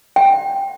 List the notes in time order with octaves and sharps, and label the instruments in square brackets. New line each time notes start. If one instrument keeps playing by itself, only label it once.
[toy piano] G5